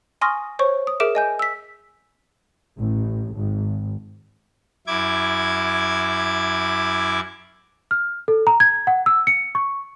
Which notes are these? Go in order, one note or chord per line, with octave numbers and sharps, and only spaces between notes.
G#5 C6 C#6 D#6 F6 A#6
C5 C#5 C#6
D#6
G#4 A#4 E5 D6 D7 E7
D#5 G#5 G6
E6 B6
A1
G#1
F#2 E4 D6 G#6
F6
A4
A#5
G#6
F#5
E6
C#7
C#6